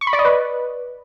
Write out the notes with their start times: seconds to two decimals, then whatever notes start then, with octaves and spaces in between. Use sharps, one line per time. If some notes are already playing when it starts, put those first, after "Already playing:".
0.01 C#6
0.07 B5
0.13 D5
0.19 D#5
0.25 B4